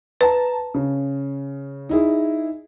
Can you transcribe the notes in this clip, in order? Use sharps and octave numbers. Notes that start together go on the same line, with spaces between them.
B4 A5 A#5
C#3
D#4 E4 G#4